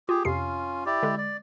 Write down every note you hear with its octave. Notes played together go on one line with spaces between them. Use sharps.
F4 G4 G#4
F2 C3 C#4 F4 C7
E4 G4 D5
D3 G#3
D5